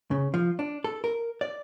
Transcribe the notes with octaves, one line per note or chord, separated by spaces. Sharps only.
C#3
F3
D4
A4
A#4
D5